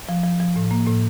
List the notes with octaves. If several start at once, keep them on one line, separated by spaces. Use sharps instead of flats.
F3
F3
F3
A2
A#3
A2